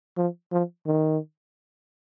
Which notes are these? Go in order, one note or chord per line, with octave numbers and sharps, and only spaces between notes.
F3
F3
D#3